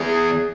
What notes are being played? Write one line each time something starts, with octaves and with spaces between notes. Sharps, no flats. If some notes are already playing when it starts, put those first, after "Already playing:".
Already playing: E2 G#4